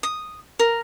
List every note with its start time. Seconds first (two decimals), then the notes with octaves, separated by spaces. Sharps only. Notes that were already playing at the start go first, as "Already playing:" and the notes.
0.03 D#6
0.59 A#4